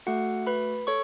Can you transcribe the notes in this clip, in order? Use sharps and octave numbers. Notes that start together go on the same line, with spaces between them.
A3 F#4 A4 F#5
B4 B5
A4 C#5 C#6